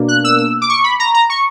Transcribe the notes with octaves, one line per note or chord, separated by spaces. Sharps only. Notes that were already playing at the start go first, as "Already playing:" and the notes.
Already playing: B2 A#3 D4
F#6
E6
E6
D6
C#6
B5
A#5
A#5
C#6